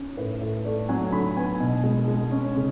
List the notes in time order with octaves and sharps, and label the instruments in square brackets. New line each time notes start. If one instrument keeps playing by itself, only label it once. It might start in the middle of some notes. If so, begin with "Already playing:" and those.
Already playing: [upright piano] C#4
A2 B4
A2
A3 D5
F#3 G#5
D3 B5
B3 G#5
B2
G#3
G#3
C#4
C#3